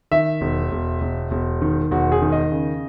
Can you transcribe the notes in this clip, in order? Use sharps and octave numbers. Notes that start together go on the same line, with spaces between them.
D#3 E5
E1
E1
E1
E1
D#3
E1 F#4
G#4
D#3
D#5
C#3